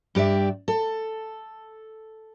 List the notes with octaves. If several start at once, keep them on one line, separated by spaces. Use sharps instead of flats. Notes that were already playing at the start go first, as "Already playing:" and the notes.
G2 G4 D5 E5
A4